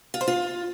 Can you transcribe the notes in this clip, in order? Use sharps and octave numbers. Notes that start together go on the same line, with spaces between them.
F4
C5
F4